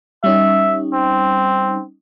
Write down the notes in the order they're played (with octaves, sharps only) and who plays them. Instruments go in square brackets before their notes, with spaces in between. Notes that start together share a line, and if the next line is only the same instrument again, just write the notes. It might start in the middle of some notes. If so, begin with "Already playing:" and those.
[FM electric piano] G3 C#4 D#4 [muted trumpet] E5
[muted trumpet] C4